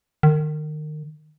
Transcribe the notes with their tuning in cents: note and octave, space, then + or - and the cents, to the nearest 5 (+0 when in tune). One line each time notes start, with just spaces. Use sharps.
D#3 -30